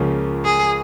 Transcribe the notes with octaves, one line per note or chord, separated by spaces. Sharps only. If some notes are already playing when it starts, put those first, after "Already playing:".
Already playing: C#2 C#3 F3 A#3 C#4
G#4